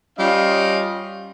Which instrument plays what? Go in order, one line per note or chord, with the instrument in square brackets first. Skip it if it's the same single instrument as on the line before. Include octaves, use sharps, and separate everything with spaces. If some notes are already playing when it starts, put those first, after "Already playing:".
[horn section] G3 C#4 F4 D#5 F5